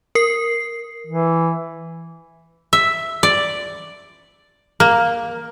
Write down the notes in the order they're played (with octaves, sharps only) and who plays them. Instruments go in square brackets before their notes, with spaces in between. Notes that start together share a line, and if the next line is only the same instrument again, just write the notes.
[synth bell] A#4 C7
[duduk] E3
[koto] E5
D5
A#3